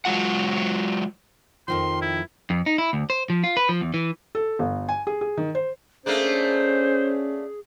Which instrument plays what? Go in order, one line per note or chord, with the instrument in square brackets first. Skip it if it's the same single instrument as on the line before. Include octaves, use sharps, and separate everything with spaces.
[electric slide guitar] F#3 G#3 F4 F#5
[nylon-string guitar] F2 D#3 F3 [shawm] C6
[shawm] E4
[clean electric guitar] F2
D#4
E4
D2
C5
F3
F4
B4
F3
E2
E3
[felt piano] A4
G1
G#5
G#4
G#4
D#3
C5
[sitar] A3 A#3 D4 [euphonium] C#4 [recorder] G#4 [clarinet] C5